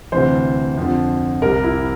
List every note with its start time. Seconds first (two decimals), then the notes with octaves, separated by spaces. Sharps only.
0.12 D2 C3 E3 C5
0.78 F2 D3 F3
1.42 C2 C3 G3 A#4
1.63 E4